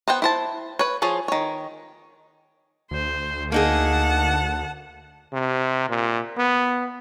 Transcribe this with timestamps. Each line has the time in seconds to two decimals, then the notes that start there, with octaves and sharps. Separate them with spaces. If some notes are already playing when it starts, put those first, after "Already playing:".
0.08 B3 C5 F#5 G5
0.22 E4 C5 A5
0.79 B4 C#5
1.02 F3 F4 G#4 C#5
1.28 D#3 C#5
2.91 D2 C5
3.52 A#3 D#4 G#4 F#5 A5
5.33 C3
5.89 A#2
6.38 B3